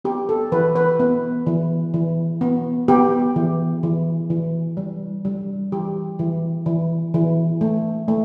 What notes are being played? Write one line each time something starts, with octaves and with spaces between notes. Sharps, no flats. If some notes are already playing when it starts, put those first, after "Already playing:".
B3 G4
A4
E3 B4
B4
B3
E3
E3
B3
B3 G4
E3
E3
E3
G3
G3
E3 G4
E3
E3
E3
A3
A3